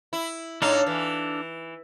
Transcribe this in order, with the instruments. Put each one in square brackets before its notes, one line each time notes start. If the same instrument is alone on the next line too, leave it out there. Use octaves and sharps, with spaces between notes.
[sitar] E4
[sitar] A2 D#4 [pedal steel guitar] D4 A4 F5
[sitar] E3